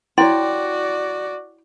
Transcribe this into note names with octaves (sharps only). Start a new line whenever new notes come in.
E4 F#4 C#5 D5 G5 C6